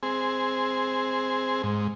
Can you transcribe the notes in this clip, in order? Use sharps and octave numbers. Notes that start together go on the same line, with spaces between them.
C4 G#4
G#2